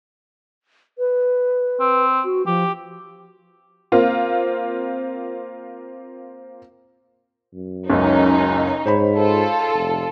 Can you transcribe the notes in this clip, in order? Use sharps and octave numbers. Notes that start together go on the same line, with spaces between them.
B4
C4
F#4
F3 G4
A#3 C4 F4 C5
F#2
F#1 C#2 C#4 D#4
G#2 C5 C#5 B5
F4 A4
F1